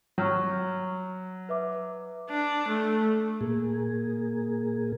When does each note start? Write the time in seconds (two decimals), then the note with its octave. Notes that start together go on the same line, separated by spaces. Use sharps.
0.18 F#3 C#6 F6 G6
1.49 B4 E5 D6
2.30 D4
2.68 A3
3.41 A#2 A#3 G#4